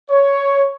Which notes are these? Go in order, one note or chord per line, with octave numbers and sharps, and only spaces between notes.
C#5